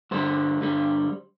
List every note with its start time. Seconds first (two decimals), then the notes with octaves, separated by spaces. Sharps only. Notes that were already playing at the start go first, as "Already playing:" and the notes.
0.11 G2 D3 G3 C5
0.61 G2 D3 G3